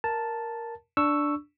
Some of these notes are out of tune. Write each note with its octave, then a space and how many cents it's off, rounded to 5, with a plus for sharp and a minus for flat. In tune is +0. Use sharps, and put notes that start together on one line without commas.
A#4 +0 A5 +0
D4 +0 C#6 +0 E6 +0